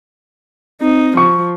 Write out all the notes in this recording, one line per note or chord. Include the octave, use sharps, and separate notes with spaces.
C4 D#4
F3 C#6